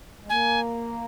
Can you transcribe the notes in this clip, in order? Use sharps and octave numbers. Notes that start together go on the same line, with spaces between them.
G#3
A#3 G#5